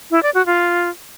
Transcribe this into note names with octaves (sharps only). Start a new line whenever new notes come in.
E4
D5
F#4
F4